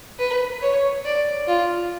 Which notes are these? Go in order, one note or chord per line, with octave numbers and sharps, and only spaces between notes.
B4
C#5
D5
F4